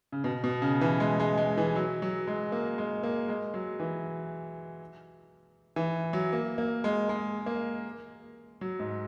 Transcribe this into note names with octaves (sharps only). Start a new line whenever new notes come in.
C#3
B2
B2
C#3
E3
G#3
G#3
G#3
E3
F#3
F#3
G#3
A#3
G#3
A#3
G#3
F#3
E3
E3
F#3
A#3
A#3
G#3
G#3
A#3
F#3
G#2